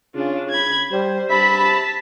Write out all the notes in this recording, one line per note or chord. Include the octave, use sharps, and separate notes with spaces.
C#3 D4 F4
B5 G#6
G3 C5
G2 C3 E5 A5 B5 B6